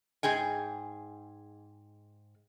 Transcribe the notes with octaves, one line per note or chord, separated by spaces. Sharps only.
G#2 G#4 G5 G#5